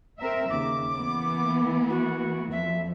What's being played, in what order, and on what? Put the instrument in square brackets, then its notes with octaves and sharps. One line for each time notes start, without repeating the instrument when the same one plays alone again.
[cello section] C4 A#4 E5
[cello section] D#2 C#3 [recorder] D6
[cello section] E3 A#3 B3
[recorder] F#4
[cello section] F2 F3 [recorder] E5